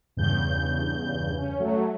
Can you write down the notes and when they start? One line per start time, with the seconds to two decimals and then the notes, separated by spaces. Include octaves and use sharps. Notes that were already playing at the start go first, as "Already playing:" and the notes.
0.17 E2 G2 C#3 G6
1.37 C#4
1.60 F#3 A3